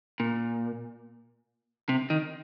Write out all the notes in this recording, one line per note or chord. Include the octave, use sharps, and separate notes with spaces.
A#2
C3
D#3